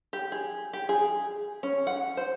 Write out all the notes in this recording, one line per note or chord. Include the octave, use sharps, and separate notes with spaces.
G4
G#4
G4
G#4
C#4
F#5
C5